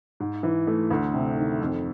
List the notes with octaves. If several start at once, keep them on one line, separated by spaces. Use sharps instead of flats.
G#2
E3
A3
D2
C3
D#3
F2